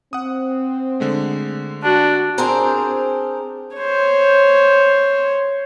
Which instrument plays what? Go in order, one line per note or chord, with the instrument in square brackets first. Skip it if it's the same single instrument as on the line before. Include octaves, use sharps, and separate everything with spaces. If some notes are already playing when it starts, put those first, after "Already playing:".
[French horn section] C4 [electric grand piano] F#5 D#6
[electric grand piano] D3 G#3 A3
[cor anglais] D4 [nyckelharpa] F#4
[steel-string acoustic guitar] C4 D4 G#4 A#4 C5
[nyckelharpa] C5 C#5